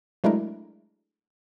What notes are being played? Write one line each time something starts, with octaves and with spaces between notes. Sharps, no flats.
F#3 G#3 A3 D4 E4 A#4